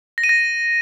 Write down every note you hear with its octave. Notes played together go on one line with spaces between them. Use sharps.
A#6
D#7
A#6